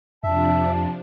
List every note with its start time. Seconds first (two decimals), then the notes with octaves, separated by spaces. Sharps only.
0.24 F2 C3 F3 D4 E5 A5